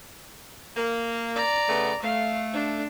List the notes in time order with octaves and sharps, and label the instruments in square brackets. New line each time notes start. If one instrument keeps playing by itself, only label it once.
[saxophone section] A#3
[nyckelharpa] D5 A#5
[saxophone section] C#3 A3 B3
[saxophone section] A3 [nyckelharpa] F5
[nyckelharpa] D4